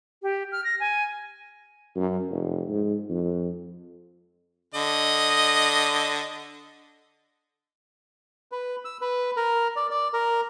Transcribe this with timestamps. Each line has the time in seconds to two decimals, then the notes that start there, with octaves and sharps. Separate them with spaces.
0.22 G4
0.52 F6
0.64 A#6
0.80 G#5
1.96 F#2
2.31 F1
2.69 G#2
3.10 F2
4.74 D3 D#5
8.52 B4
8.85 E6
9.01 B4
9.37 A#4
9.76 D5
9.90 D5
10.13 A#4